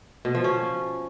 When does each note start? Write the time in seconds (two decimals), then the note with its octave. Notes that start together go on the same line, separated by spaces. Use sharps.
0.25 B2
0.35 F3
0.44 C#4